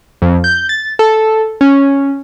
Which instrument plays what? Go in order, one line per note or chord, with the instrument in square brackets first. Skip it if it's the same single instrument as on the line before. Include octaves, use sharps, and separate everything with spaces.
[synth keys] F2
G6
A6
A4
C#4